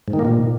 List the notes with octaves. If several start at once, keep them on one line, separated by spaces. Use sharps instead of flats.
G#2
D#3
A#3
A#2